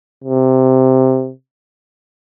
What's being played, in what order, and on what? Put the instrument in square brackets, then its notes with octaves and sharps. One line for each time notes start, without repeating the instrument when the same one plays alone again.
[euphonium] C3